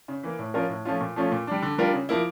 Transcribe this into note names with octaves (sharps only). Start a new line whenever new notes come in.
C#3
E3 A#3
A2
F3 C#4 F4 A#4
A2
F3 A3 C#4 F4
A#2
F3 A3 C#4 F4
A#2
G3 D4
D3
G3 D4 F4 A#4
C#3
F3 A#3 E4